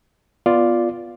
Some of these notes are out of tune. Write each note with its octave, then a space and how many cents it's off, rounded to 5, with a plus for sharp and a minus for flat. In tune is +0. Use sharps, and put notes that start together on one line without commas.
B3 +0 F4 +0 D5 +0